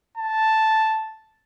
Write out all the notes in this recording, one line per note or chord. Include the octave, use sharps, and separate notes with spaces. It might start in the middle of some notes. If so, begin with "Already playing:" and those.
A5